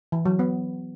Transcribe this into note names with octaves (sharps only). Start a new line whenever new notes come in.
E3
F#3
B3